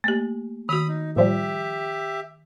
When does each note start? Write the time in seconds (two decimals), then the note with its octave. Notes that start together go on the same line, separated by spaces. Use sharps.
0.04 A3 A#3 G4
0.69 D#3 F#4 B5 D#6
0.89 D#4
1.16 A2 F3 G3 G4 E5